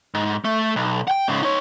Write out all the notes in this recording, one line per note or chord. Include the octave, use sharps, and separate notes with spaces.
G#2
A3
B1
F#5 G5
G#2 C#3
D#4 C#5